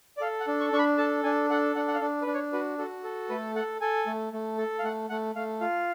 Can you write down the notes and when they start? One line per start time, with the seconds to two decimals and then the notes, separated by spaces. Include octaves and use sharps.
0.17 D5
0.21 A4 F5
0.40 F#5
0.47 D4
0.60 C#6
0.72 D4 C#6
0.79 B5
0.98 A4 A5
1.24 D4 G#5
1.50 A4 F#5
1.75 D4 F#5
1.88 F#5
1.94 F5
2.01 D4
2.22 B4
2.27 D4
2.34 C#5
2.53 F#4 B4
2.78 F#4 A4
3.04 A4
3.29 A3 B4
3.56 A4 F#5
3.81 A4 G#5
4.07 A3
4.33 A3
4.58 A4
4.79 F5
4.83 A3 F#5
5.09 A3 F#5
5.35 A3 F5
5.61 F4 F5